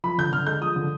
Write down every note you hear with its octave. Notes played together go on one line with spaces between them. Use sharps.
F3 B5
D3 G6
D3 F6
G#3 G6
F3 D#6
D3